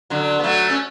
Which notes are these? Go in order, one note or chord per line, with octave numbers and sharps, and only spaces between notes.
D3 F#3
B3
F#3 A3
C#4